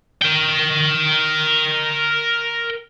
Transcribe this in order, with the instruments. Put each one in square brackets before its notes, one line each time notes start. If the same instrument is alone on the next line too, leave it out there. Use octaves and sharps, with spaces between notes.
[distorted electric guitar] A#4 G5